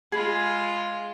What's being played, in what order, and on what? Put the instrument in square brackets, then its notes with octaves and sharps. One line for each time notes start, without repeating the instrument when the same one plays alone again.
[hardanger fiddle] G#3 F4 [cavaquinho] G#4 B5